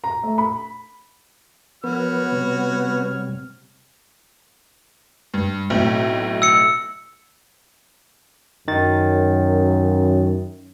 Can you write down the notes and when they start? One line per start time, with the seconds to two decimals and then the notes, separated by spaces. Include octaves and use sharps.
0.04 A#5
0.23 A3
0.38 B5
1.84 F3 B3 F#4 A#4 C#5 F6
2.32 C3 G3 C4
5.34 G2
5.70 B1 A2 C4
6.42 E6 C#7
8.68 F#2 D#3 A6